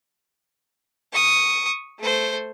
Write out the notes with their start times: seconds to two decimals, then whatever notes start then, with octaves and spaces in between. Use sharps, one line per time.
1.13 C#6 D#6
2.00 A3 C5